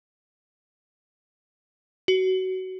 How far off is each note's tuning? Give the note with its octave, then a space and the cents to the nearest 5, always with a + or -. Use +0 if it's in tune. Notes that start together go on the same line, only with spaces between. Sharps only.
F#4 +20